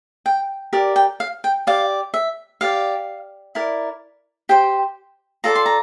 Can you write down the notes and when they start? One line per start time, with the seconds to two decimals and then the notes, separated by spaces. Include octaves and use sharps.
0.26 G5
0.73 G4 A#4 D5
0.96 G5
1.20 F5
1.44 G5
1.67 G4 D5 F5
2.14 E5
2.61 G4 D5 F5
3.55 E4 A#4 D5
4.49 G4 C5 G5
5.44 F4 A4 D5 A#5
5.55 C6
5.66 A#5